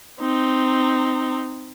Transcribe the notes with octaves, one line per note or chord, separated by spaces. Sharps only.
C4 D#4